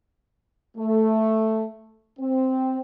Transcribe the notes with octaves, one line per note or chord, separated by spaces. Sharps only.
A3
C4